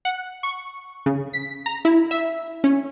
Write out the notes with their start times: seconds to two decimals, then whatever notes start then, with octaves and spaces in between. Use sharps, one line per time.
0.05 F#5
0.43 C#6
1.06 C#3
1.33 B6
1.66 A#5
1.85 E4
2.11 E5
2.64 C#4